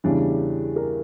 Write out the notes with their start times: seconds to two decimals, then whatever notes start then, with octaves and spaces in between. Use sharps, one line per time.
0.04 E2 C#3 E3 G3 D4 D5
0.76 A#4